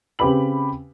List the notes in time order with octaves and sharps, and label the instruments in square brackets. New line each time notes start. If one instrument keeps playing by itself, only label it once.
[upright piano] C#3 C4 G4 B4 B5 F#7